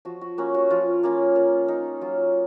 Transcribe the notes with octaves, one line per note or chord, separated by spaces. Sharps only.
F3 F#4
F#4
A#3 C#4 F#4
F#4
F3 F4
A#3 C#4 F4
A#3
D#4
F#3 F4